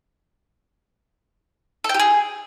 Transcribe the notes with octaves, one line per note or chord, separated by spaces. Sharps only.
A4
G5
G4
G#4